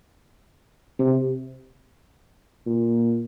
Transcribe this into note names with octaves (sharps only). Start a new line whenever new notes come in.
C3
A#2